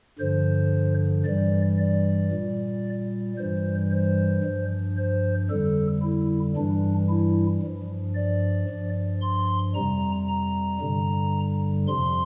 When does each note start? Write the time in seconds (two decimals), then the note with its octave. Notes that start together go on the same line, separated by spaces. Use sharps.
0.19 G2 D3 F3 C5
1.25 G2 E3 G3 D5
1.78 D5
2.31 A#2 G3
3.37 G2 E3 G3 C5
3.91 C5
4.44 G2 F3
4.97 C5
5.50 F2 D3 G3 A4
6.03 E4
6.57 G2 E3 G3 D4
7.09 E4
7.63 G2 F3
8.15 D5
8.69 G2 F3
9.21 C6
9.75 F2 C3 G3 A#5
10.29 A#5
10.81 G2 D3 G3
11.88 F2 C3 F3 C6